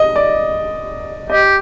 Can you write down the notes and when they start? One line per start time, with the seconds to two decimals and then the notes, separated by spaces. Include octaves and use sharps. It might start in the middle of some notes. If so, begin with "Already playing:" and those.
Already playing: D#5
0.16 D5
1.30 G4 D#5